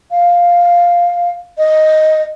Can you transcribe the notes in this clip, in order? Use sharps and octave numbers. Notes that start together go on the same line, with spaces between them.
F5
D#5